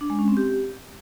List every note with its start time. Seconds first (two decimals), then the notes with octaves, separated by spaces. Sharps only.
0.01 D4
0.10 G#3
0.19 C#4
0.28 C4
0.37 G4